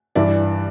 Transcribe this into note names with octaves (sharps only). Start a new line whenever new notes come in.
G2 E3 D5 E5